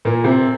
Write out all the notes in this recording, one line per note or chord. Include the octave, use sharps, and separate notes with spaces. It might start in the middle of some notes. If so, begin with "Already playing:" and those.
A#2 A#3
C3 C4